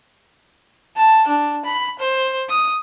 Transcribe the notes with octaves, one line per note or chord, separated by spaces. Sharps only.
A5
D4
B5
C5
D#6